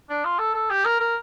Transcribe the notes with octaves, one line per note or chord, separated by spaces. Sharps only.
D4
F4
A4
A4
G4
A#4
A#4